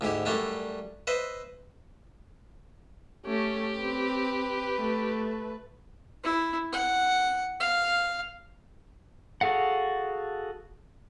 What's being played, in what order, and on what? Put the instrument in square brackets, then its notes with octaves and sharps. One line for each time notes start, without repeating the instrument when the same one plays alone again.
[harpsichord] D2 G#2 E4 G4
F#2 G3 A3 D4 E4
B4 C5 D#5 E5
[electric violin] A3 [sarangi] C#4 [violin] G4
[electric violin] C4 [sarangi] B4
[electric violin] A3
[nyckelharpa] E4
F#5
F5
[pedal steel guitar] F#4 G#4 A4 F5 F#5